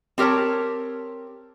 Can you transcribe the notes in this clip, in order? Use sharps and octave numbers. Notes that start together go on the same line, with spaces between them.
C4 G4 A#4 C#5 A5